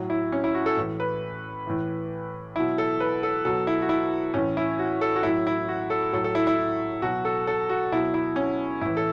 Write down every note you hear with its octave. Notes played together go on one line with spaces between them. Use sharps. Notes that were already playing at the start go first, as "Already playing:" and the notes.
Already playing: A2 F#3
E4
C#4
E4
F#4
A4
A2 E3
B4
A2 E3
B2 F#3 E4
A4
B4
A4
B2 F#3 A4
E4
F#4
E4
A2 E3 C#4
E4
F#4
A4
F#4
A2 F#3 E4
E4
F#4
A4
A2 F#3 A4
A4
E4
E4
B2 F#3 F#4
A4
A4
F#4
B2 F#3 E4
E4
C#4
A2 E3 E4
A4